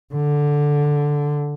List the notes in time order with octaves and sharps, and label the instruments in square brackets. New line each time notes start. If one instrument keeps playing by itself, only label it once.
[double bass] D3